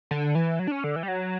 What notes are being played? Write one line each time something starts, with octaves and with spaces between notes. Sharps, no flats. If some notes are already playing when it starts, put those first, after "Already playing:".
D3
E3
F#3
D4
C#4
D3
E3
G3
F#3